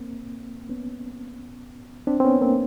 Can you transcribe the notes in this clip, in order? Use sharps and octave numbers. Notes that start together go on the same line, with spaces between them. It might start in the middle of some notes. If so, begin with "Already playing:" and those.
Already playing: A#3 C4
B3 C#4
C4 D4
C4
B3 C#4
A#3 C4